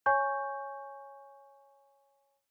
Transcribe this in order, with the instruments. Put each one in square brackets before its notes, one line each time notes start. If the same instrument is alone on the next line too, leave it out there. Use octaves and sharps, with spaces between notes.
[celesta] C#5 G#5 C#6 G6